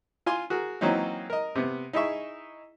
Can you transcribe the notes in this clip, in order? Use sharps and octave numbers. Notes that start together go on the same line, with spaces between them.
F4 G#5 C6
F#4 G#4 A#4
E3 F#3 A#3 C4 C#4 D#4
A#4 D#5
C3 B3
D#4 E4 G#4 E5 C#6